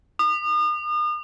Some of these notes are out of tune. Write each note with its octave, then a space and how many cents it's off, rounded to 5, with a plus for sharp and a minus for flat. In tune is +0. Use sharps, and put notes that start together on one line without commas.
D#6 -40